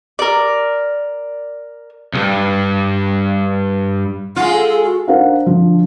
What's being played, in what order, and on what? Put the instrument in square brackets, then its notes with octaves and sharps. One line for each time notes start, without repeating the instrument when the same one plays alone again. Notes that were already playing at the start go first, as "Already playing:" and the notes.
[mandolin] A#4 D5
[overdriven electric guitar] C2 G2
[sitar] G#3 F4 [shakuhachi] F#5
[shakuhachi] A4
A4
F#4
[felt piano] D4 A#4 C5 F5 F#5
D3 F3